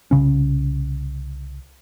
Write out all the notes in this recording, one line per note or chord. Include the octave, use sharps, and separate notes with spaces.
C2 C#3 C#4